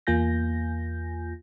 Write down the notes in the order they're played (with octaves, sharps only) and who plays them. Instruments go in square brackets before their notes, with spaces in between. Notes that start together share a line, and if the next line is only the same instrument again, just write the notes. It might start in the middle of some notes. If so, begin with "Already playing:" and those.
[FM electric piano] E2 A#3 F4 G#5 G6 A#6